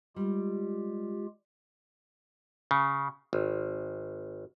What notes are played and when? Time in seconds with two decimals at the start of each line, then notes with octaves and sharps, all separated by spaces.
0.16 G3 G#3 F4 G4
2.71 C#3
3.33 G#1